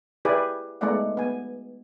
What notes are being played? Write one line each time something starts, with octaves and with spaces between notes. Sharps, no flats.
E4 G4 G#4 B4 D5 G#5
G#3 A3 B3 D#4 D5 F#5
B3 G#5